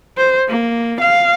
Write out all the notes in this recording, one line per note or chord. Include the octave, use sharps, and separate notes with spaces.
C5
A#3
F5